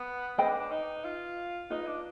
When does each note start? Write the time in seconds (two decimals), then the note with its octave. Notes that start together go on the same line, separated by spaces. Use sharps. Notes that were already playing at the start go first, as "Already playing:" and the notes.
Already playing: B3
0.38 C4 B4 D#5 G5 B5
0.49 D4
0.60 D4
0.71 D#4
1.04 F4
1.70 D#4 F4 B4 D#5
1.87 D4